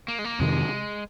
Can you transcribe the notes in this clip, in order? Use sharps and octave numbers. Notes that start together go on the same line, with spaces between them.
A#3
G#3
A#3
F2 C3 D#3 G#3